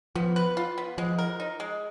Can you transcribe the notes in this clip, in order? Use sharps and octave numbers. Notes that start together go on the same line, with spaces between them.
F3 B3
B4
F4
B3
F3 G#3
A#4
D#4
G#3